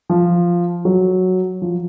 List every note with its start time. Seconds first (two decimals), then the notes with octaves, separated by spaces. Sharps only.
0.10 F3
0.85 F#3
1.62 F3